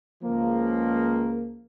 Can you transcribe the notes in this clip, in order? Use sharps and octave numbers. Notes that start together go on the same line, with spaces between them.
C#2 C#3 F3 A#3